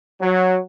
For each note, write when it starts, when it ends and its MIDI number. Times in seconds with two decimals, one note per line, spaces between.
0.21 0.57 54